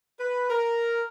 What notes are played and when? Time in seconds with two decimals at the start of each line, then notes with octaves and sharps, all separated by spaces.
0.19 B4
0.50 A#4